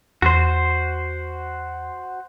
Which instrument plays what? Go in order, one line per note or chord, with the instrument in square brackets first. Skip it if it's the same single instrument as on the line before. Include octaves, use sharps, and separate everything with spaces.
[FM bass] E2 [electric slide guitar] F#4 C5